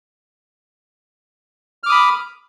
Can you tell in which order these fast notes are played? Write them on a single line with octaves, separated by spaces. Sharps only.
F6 D6 D#6 B5